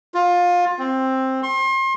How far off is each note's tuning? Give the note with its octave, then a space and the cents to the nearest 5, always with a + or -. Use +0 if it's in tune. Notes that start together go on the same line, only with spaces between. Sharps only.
F4 +20
C4 +10
C6 +35